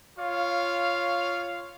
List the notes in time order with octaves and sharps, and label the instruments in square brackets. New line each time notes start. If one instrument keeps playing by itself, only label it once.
[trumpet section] F4 C#5 F5